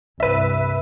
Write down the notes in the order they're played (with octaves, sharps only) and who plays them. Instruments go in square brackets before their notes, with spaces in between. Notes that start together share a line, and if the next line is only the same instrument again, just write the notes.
[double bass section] C2 G2 [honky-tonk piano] B4 E5